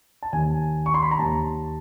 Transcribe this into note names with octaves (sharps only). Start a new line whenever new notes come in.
A5
D#2 D#3 G#5
C#6
C6
B5
A#5
D#2 D#3 A5